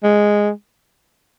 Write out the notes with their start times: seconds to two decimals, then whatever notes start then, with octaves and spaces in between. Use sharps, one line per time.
0.04 G#3